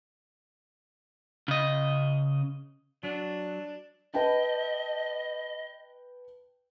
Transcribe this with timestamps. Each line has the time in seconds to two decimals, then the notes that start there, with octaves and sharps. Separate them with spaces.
1.48 C#3 D#5
3.03 F#3 D4
4.14 B4 D#5 G5 A5